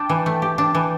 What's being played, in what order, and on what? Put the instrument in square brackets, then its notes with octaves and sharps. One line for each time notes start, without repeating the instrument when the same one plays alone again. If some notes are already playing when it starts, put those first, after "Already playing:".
Already playing: [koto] D4 [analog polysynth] G5 A5
[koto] E3
A3
G4
D4
E3